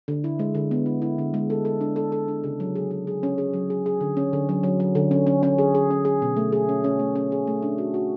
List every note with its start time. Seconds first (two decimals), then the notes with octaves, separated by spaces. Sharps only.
0.08 D3
0.24 E4
0.39 G#3
0.55 D3
0.71 B3
0.86 E4
1.02 E4
1.18 D3
1.34 G#3
1.50 A4
1.65 A4
1.81 D4
1.96 A4
2.12 A4
2.28 D4
2.44 C#3
2.60 F#3
2.76 G#4
2.91 G#4
3.07 G#4
3.23 C#4
3.38 G#4
3.54 F#3
3.70 G#4
3.86 G#4
4.01 D3
4.17 C#4
4.33 D3
4.49 F#3
4.63 F#3
4.80 F#3
4.95 D3
5.11 C#4
5.27 C#4
5.43 C#4
5.58 G#4
5.75 G#4
5.90 C#4
6.05 G#4
6.22 B2
6.37 A3
6.52 G#4
6.69 C#4
6.84 C#4
6.99 A3
7.16 C#4
7.32 G#4
7.47 A3
7.62 D4
7.78 F#4
7.94 F#4